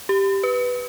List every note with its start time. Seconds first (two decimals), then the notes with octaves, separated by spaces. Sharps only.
0.09 G4
0.43 B4